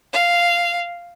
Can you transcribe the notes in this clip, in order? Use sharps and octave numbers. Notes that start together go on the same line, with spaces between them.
F5